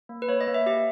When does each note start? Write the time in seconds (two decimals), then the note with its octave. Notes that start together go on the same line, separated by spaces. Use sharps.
0.09 A#3
0.22 B4
0.28 A#3 C#5
0.41 D#5
0.47 A#3
0.54 E5
0.66 G4 E5